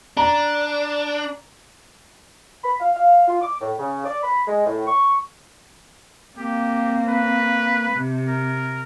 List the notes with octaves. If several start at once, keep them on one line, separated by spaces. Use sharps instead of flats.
D4 A#5
B5
F5
F5
F4
D6
A2
C#3
D5
B5
G#3
A2
C#6
A#3 C4 G4
B4
C3
A#4